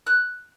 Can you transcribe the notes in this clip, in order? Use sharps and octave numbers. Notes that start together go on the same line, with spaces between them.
F#6